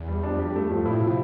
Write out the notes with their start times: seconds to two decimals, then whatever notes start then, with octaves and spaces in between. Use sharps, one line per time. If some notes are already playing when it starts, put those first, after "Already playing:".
Already playing: E2
0.08 G3
0.23 F2 D4
0.39 G4
0.54 G2 A3
0.70 F3
0.86 A2 E4
1.01 C3 F3